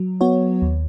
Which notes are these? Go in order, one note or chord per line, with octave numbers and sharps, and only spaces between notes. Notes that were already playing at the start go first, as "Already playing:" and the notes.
Already playing: F#3
B3 F#4 C#5
D#2